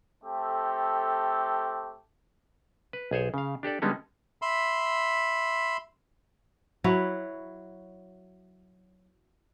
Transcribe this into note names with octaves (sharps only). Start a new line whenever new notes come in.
A3 C4 G4 A4
B4
B1 G#4 C5 C#5
C#3 F5
D4 G4 A4 D5
D3 G3 G#3 B3 C#4 D#4
E5 B5 C6
F#3 E4 B4 C#5